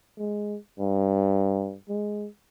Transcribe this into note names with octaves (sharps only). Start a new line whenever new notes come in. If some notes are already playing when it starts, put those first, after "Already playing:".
G#3
G2
G#3